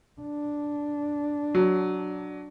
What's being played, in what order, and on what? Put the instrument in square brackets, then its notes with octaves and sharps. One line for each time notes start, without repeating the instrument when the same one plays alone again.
[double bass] D4
[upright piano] F#3